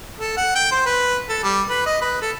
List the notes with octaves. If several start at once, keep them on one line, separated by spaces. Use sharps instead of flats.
A4
F#5
G5
C5
B4
A4
G3
B4
D#5
B4
A4